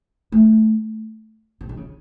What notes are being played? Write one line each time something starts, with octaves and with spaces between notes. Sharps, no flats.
A3
C3
D#3
C#3